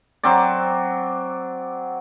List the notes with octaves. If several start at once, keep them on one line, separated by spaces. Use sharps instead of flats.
F#3 C4 D5